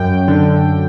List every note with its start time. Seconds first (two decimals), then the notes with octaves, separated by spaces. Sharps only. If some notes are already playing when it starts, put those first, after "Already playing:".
Already playing: F#2 G5
0.28 D3